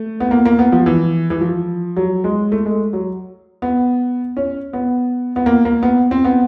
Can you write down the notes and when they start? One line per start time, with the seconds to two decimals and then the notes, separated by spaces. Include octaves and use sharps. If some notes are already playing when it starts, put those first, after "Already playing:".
Already playing: A3
0.20 B3
0.31 A#3
0.45 A#3
0.59 B3
0.72 F3
0.86 E3
1.30 E3
1.41 F3
1.97 F#3
2.24 G#3
2.52 A3
2.66 G#3
2.93 F#3
3.62 B3
4.37 C#4
4.73 B3
5.36 B3
5.46 A#3
5.65 A#3
5.83 B3
6.11 C4
6.25 B3